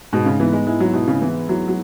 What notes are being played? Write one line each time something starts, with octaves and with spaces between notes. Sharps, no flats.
G#2 B2
C#3
E3 B3
G#3
G#3 E4
F#3
B2 E4
C#3
E3 B3
F#3 E4
F#3